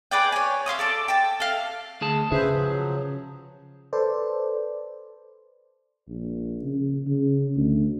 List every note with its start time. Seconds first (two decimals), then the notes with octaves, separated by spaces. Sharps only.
0.11 G#4 B4 D5 G5
0.32 C#5 G#5
0.66 E5 F5 C6 D#6
0.79 A4 D5 A5
1.08 G5 A5
1.40 A4 F5
2.01 D2 G#4 A5
2.32 C#3 G#4 B4 C5 E5
2.54 F3 F#3
3.93 A4 B4 C5 D5
6.09 A#1
6.63 C#3
7.07 C#3
7.57 D2